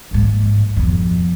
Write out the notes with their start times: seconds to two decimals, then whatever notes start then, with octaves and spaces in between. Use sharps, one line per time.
0.11 A#1 G#2
0.77 F2 B2